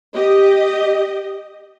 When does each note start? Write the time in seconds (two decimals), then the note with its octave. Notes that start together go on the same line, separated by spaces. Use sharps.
0.14 G4 D#5